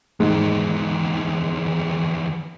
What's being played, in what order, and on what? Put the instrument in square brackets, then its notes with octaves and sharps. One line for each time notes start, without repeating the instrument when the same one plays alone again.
[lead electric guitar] E2 D#3 [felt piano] G#2